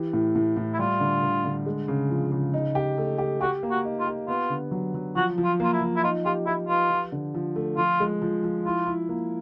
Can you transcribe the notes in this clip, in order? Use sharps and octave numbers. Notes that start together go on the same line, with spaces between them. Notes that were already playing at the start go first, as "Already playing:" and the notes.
Already playing: E3 G4
A2
A2
A2
E4
G3 F4
D3
D3
D3
G#3
C#3
F3
C#3
D#4
G4
A3
G4
F#4 G4
A#3
F#4
D#4
F4
G4
B3 F4
D3
F#3
F#3
F3 F#4
F3
F4
A#3 F4
E4
F3
E4
D#4 F4
F4 G4
E4 G4
F4 B4
F3
D3
F3
A3
F3 F4
G#3
F3
F3
E4 F4
E4
A#3